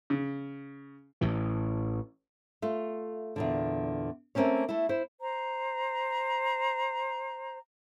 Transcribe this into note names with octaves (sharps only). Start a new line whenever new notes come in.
C#3
A1 A2 E3
A3 F4
E2 A#2 D3
A3 A#3 C4 C#4 C#5
A3 E4
E4 C5
C5 A#5